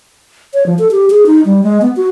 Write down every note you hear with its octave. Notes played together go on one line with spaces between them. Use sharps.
C#5
F3
A4
G4
G#4
D#4
G3
G#3
B3
F#4